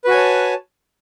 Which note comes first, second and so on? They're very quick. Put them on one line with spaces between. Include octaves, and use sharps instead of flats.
B4 F#4 G#5 C#5 A5